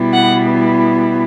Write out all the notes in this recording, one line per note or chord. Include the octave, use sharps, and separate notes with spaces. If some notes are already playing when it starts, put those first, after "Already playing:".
Already playing: B2 G3 B3 E4
F#5